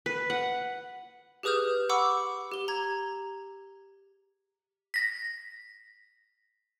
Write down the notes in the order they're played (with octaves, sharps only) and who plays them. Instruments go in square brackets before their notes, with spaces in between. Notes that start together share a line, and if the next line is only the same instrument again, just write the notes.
[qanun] B4
F#5
[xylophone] G4 G#4 B4 D#6 F6 G6
F#5 B5 C#6 D6 E6
G4 G7
A#5 G#6
[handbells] A#6 B6